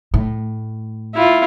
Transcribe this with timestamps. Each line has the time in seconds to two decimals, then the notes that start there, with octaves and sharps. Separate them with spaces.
0.14 A2
1.15 E4 F4